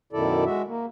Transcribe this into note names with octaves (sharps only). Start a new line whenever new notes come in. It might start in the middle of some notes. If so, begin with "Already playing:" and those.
F#2 B2 D#3 E4 A4 D5
G#3 F#4 E5
A#3